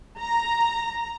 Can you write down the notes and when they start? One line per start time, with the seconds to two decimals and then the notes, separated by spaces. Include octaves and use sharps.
0.19 A#5